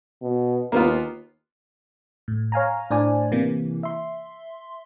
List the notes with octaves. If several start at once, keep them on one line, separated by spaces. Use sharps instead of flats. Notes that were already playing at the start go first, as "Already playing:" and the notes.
B2
D#2 A#3 B3 F4
A2
C#5 F5 G#5 A#5
A2 D4 C5 D5 G#5
C3 E3 A#3
E5 C6